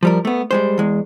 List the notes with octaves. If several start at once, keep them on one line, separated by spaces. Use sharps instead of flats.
F3 G3 A#4
A3 B3
G3 G#3 C5
E2 G#3